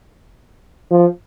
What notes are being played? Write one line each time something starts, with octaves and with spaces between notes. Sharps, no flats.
F3